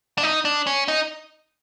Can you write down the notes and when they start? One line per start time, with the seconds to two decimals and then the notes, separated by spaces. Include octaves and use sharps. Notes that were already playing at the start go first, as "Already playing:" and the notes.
0.18 D4
0.23 D#4
0.45 D4
0.67 C#4
0.88 D#4